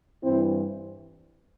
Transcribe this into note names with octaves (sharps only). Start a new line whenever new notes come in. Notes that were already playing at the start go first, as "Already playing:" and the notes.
G2 E3 C4 E4